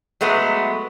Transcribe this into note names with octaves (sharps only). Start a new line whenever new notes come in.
F#3 G#3 A3 B3